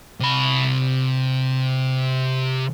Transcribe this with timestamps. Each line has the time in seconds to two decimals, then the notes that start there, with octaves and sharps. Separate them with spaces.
0.20 C3 B5